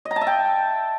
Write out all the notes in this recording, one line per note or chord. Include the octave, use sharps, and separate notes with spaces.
D#5
A#5
A5
E5
G5